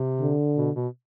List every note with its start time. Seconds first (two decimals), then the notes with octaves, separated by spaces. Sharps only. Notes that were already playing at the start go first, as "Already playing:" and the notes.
Already playing: C3
0.21 D3
0.57 B2
0.75 B2